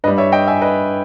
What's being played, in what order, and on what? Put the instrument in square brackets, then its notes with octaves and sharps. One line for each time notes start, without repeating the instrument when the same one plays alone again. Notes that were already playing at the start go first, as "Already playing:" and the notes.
[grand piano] G2 B4 D#5
G3
C#5 E5
D#5 G5
E5 G#5
B4 D#5